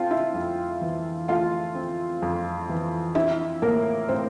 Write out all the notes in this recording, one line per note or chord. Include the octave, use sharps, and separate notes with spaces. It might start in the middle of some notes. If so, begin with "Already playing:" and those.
Already playing: A3 C4 F4 F5 G5 A5
E4 E5
F2
E3
A3 F4 F5
C4
F2
E3
C4 E4 E5
A2 A#3 A#4
A2 C4 C5